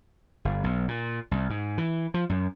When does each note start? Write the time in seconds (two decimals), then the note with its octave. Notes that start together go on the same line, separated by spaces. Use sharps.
0.45 G1
0.64 B1
0.88 A#2
1.31 C2
1.50 G#2
1.78 E3
2.14 F3
2.29 F#2